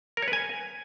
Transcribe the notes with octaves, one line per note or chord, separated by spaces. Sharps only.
A#4
C#5
B4
G#5